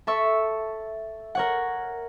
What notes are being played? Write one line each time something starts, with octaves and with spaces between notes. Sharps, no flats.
A4 E5 C#6
A#4 C#5 F#5